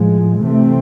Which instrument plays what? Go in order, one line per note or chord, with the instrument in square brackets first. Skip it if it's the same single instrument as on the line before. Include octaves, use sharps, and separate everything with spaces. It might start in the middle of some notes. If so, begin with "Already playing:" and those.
Already playing: [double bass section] A2 F3 G#3
C3 E3 A3 C4